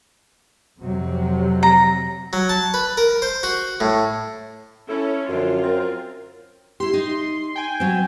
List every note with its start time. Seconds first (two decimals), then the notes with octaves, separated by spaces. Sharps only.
0.82 F2 C3 F#3
1.63 A#5
2.33 F#3
2.49 A5
2.74 B4
2.97 A#4
3.22 C5
3.43 F#4
3.80 A2
4.88 C#4 E4 A4
5.29 F#2 D3 F3 F4
5.62 C4 A#4
6.80 E4 G4 C6
6.93 D#4
7.55 G5 G#5
7.80 F#3 C4